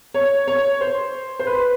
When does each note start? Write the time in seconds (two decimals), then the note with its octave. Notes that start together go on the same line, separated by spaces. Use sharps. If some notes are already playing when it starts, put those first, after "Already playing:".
0.14 C#5
0.48 C#5
0.81 C5
1.39 C5
1.47 B4